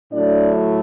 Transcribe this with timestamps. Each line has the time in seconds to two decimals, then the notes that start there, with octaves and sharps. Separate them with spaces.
0.11 A2 F#3 A3 D4 D5